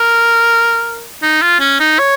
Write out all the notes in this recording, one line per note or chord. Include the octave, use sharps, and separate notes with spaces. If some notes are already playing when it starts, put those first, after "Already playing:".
Already playing: A#4
D#4
F4
C#4
D#4
C#5